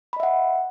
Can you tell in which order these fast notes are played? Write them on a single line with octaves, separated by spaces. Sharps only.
B5 D#5 E5 F#5